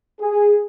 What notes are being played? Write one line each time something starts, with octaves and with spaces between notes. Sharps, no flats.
G#4